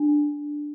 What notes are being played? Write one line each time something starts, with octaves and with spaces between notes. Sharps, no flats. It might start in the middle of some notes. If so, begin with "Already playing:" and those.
Already playing: D4